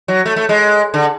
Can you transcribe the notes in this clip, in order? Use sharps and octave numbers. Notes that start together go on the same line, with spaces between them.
F#3
A3
A3
G#3
D3